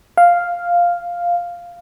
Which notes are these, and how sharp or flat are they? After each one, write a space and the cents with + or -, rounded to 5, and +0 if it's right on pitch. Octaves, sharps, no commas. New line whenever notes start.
F5 +0